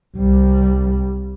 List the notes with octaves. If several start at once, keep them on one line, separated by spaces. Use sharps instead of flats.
C2 G3